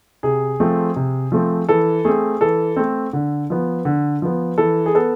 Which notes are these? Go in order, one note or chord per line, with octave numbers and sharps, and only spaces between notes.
C3 G#4
F3 A3 C4
C3
F3 A3 C4
E3 A4
A3 C4 G#4
E3 A4
A3 C4
D3
F3 B3
D3
F3 B3
E3 A4
G#4
B3 A4